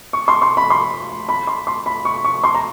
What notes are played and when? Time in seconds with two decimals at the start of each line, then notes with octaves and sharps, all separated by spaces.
0.13 C#6
0.28 C6
0.42 C6
0.57 B5
0.70 C6
1.29 B5
1.47 C6
1.67 C6
1.86 B5
2.05 C#6
2.25 C#6
2.44 C6
2.54 A#5